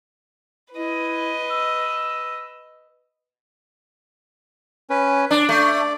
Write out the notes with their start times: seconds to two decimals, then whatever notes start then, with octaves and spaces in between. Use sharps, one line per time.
0.73 E4 B4 D#5
1.50 E6
4.90 C#4 B4
5.31 D4 D5
5.49 A3